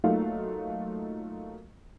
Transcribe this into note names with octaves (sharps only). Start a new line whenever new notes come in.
F#3 A3 A#3 D#4 F4 F5